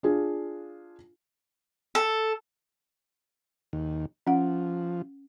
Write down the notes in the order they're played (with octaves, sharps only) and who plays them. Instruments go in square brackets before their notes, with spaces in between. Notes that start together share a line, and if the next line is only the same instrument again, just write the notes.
[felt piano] D4 F4 G#4
[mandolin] A4
[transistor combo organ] D#2
[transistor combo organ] F3 [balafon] C#4 F#5